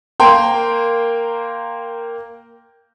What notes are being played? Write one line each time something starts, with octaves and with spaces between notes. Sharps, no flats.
A#3 A#4 G5 C6